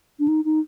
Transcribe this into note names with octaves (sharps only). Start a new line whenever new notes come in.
D4
D#4
D#4